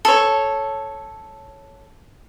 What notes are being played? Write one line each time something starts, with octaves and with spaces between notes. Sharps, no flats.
A4 C#5